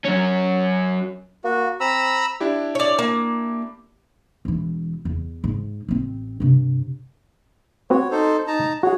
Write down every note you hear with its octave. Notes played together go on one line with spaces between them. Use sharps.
F#2 C#4
A#3 F#4
C4 A#5 B5 E6
D4 E4 G4
C#5 D5
A#3
E1 E3
E2
G#2
A1 C4
G2 C3
B3 C4 F#4 C#5
D#4 A4 C5
D#4 A5 A#5
F#4 G#4 C#5